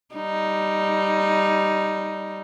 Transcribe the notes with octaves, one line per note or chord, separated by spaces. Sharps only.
G3 D#4